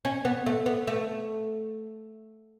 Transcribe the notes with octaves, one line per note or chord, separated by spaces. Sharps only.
C#4
B3
A3
B3
A3